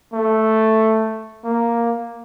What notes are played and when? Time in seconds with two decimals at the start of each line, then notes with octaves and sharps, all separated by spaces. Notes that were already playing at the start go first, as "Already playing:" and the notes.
0.13 A3
1.44 A#3